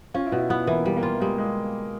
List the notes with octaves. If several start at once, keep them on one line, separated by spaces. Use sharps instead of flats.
C#4 F4
E4
B2
E4
B3 E4
E3 A#3
G3 A#3
A#3
F4
G3 G#3
G#3